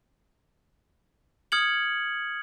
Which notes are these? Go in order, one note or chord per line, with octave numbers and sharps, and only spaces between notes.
D#6 F6 G#6 C#7 F#7